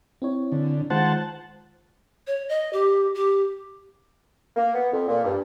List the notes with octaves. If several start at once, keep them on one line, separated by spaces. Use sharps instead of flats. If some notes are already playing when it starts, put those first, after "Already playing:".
C4 E4 C#5
D3
D#3 G#3 F4 C5 F#5 A5
C#5
D#5
G4
G4
A#3
B3
F2
A#2
G2